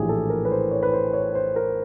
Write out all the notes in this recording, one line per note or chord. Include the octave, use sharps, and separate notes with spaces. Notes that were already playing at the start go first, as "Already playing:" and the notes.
Already playing: A#1 A2 E3 G4 G#4
A4
A#4
B4
C5
C#5
B4
C5
C#5
C5
A#4